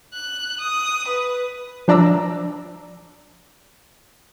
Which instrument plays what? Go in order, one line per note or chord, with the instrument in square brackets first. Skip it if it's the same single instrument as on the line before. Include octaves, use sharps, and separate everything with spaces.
[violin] F#6
D#6
B4
[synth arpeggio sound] F3 D4 D5 A#5 E6